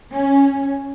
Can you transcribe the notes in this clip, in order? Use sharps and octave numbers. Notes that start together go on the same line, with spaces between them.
C#4